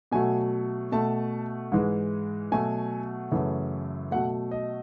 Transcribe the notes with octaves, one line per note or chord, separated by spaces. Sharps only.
B2 F#3 A3 G#5
B2 A3 A5
G#2 E3 G#3
B2 F#3 A3 G#5
F#2 C#3 E3 A3
B2 F#3 A3 F#5
D#5